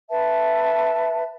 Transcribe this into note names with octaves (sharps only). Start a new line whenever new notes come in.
B4 E5 A5